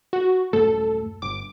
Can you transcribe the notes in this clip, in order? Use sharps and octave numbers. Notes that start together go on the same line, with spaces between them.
F#4
D#1 F#2 A3 A4
G1 D6